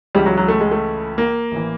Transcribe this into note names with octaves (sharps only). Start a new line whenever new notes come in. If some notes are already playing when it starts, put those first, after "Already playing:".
C#2 C#3 E3 G3
F#3
F#3
A3
G#3
A3
A#3
A1 E3